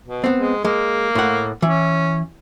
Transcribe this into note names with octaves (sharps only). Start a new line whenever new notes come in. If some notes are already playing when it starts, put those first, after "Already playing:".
B2
B3 C4
G#3
G#3 A#3
A2 F#5
E3 C#4